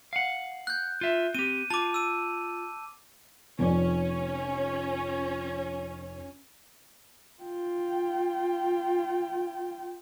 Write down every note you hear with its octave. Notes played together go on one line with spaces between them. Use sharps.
F5 F#5
F#6 G6
F4 E5
C4 G4 D#7
F4 A5 D6
E6 D#7
F1 F2 C#4 D5
F4 G5